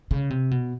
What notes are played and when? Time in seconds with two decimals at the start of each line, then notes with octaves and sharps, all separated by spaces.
0.11 C#3
0.30 C3
0.51 B2